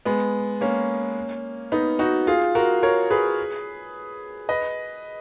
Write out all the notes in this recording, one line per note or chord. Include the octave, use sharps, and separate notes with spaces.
G#3 B3
A#3 C#4
B3 D#4
D#4 F#4
F4 G#4
F#4 A#4
A#4 C#5
G#4 B4
B4 D#5